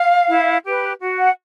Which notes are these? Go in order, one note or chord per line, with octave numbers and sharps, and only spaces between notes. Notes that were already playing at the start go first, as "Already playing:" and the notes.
Already playing: F5
E4
G4 B4
F#4
F#5